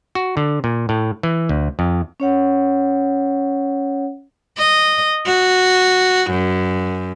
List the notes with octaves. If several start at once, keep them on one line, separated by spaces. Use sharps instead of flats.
F#4
D3
A#2
A2
E3
D2
F2
C#4 C#5 F#5
D#5
F#4
F#2